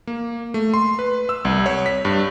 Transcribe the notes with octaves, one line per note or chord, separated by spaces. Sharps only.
A#3
A3
C6
B4
E6
C2
C#5
B6
G2